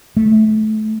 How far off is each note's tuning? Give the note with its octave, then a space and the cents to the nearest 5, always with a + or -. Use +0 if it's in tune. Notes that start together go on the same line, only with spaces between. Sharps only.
A3 -25